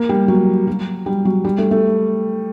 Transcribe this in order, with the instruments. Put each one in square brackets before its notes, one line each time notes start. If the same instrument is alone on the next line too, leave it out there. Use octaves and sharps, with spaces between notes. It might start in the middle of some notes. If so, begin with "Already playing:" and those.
Already playing: [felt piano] A#3
G3
F#3
F#3
G3
F#3
G3
A3
A3